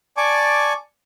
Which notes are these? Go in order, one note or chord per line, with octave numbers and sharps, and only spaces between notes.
D5 G#5 A5 C#6 D6